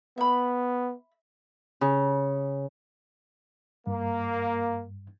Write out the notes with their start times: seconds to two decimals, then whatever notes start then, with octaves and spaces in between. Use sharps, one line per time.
0.18 B3 E5 B5
1.81 C#3
3.87 G2 A#3